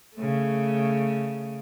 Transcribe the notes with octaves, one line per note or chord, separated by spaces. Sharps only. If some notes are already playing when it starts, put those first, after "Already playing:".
C#3 A3